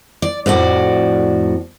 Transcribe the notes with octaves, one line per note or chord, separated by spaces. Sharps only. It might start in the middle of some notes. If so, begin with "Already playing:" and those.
D5
F2 A2 F#4 D5